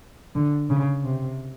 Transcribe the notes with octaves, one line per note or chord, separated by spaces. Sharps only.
D3
C#3
C3